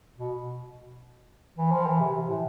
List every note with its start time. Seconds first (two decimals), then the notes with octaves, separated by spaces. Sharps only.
0.18 B2
1.58 E3
1.71 F3
1.86 E3
2.00 C3
2.14 C3
2.28 A2